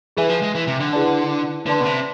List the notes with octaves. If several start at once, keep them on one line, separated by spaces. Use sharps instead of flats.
E3 G#4 B4 E5 G#5
F3
G#3
E3
C3
D3
E4 G#4 B4 D5 A5
D3 B4 D5 A5 C6
B2
C3